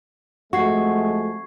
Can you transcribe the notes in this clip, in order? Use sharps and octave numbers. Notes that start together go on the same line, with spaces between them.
F2 G#3 A3 F#4 C#6 G#6 C7